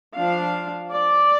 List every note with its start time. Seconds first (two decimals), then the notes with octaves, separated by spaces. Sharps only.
0.16 F3 D4 F4 F5
0.93 D5